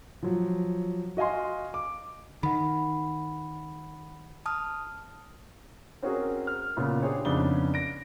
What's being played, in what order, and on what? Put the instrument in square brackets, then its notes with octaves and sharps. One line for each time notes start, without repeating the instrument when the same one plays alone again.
[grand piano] F3 F#3
F#4 D#5 F5 G#5 C6
D6
[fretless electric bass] D#3 [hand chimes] F#5 B5
[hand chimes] A5 D#6 F6
[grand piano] C4 C#4 F#4 G#4 A#4
F6
A#2 C#3 B3 F4
D4 G4 G#4 C5 C#5
F2 C#3 B3 D4 D#4 G7
A#6 D7